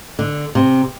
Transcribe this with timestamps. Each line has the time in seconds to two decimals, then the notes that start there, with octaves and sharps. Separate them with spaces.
0.19 D3
0.55 C3